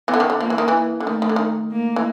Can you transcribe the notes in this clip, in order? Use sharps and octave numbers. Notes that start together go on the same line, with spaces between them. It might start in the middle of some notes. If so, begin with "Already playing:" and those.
E3 B3
D3
D#3
D3
F3 A#3
E3
D#3
E3
D3
D#3 A3
D#3
D3
D#3
A#3
E3